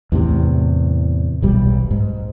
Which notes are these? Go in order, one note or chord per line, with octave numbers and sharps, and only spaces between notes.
E2 A2 C3
D#1 B1 G3
G#2